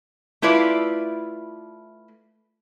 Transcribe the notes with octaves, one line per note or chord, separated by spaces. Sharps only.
A3 E4 F4 B4 D5